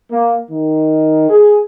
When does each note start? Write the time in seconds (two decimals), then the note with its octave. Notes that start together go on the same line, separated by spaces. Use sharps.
0.10 A#3
0.50 D#3
1.29 G#4